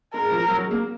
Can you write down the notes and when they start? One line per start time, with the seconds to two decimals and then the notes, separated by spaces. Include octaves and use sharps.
0.14 G#3 A#4
0.31 F3
0.48 F#3
0.60 G#3
0.71 A#3